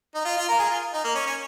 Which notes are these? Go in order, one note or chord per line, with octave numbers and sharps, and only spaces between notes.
D#4
F4
F4
A#4
G#4
F4
D#4
A#3
C#4
C#4